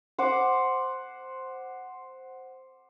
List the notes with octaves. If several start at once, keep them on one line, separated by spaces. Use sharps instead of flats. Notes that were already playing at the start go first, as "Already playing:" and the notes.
C5 F#5 D6